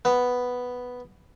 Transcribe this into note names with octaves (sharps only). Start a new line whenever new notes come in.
B3